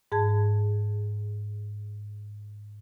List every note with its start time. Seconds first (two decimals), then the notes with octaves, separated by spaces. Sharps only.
0.12 G#2 G#4 A5 G#6